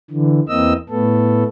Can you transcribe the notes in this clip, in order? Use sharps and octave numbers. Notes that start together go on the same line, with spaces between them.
D3 E3
E2 E3 A#3 C4 D#5 E6
A2 A3 B3 A4